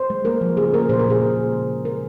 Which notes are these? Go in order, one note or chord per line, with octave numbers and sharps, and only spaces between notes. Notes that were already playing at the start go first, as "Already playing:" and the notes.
Already playing: C5
G#3
A#3 A#4
F3
C#3 G#4
A#3 A#4
A#2 C5
A#4
A#2 G#4
A#2
G#3
C#3
G#3
G#3 A#4